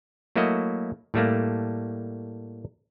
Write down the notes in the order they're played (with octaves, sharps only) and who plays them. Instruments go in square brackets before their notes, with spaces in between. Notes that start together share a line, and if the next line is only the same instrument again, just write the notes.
[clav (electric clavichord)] F#3 A3 A#3 E4 F#4 D#5
A2 G3 A3 A#3